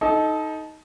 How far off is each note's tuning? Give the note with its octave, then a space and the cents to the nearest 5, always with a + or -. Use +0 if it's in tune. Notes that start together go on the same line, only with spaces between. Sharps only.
D#4 +10 A4 -20